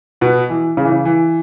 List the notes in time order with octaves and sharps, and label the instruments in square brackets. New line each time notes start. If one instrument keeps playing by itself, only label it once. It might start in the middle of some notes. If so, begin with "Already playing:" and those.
[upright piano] B2 B3
E3
C#3
E3
C#3
E3